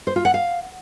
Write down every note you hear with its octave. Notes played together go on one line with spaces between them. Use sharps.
C5
F4
F#5
F5